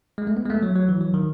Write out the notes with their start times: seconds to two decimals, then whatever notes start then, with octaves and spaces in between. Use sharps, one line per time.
0.18 G#3
0.27 A3
0.37 B3
0.45 G#3
0.50 A3
0.63 F#3
0.76 F#3
0.89 E3
1.01 F#3
1.14 D#3